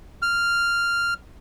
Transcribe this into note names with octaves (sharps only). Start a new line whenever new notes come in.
F6